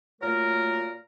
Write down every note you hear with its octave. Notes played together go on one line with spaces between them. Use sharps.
A#2 F#3 A3 A#4